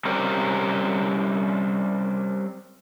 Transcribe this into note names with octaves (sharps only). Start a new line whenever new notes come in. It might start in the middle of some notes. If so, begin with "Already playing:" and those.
G3 C4 C#4 A#4